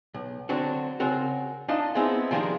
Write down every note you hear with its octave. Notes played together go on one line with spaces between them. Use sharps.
B1
D3 F#3 C4 D4 F#4
C#3 C4 F#4 A#4
D4 D#4 F4 D#5 F5 A5
G#3 B3 C4 D#4 E4
D#3 F3 G3 G#3 A#3 D4